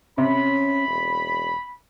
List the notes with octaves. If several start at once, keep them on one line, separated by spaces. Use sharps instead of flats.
C3 C#4 B5
E1